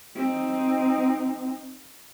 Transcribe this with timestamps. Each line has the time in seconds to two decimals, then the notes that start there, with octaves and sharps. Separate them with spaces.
0.16 C4 D#4